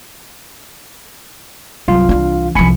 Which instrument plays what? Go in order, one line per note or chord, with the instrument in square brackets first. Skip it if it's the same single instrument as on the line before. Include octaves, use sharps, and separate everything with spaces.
[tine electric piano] C2 F4 F5 [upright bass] G2 F#3
[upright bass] E3 D4
[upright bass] C2 F3 [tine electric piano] G#5 B5 C#7